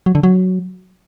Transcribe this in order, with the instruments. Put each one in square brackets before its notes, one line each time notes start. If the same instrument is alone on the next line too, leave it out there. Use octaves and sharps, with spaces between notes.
[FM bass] F#3
D3
F#3